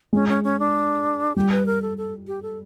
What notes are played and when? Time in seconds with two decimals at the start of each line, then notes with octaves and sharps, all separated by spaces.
0.13 G#3 C#4
0.29 C#4
0.44 C#4
0.59 D4
1.36 G3 G4
1.51 B4
1.66 A#4
1.82 A4
1.98 A4
2.27 G4
2.42 A4